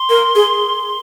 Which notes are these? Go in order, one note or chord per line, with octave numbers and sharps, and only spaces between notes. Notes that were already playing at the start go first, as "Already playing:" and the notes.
Already playing: C6
A#4
G#4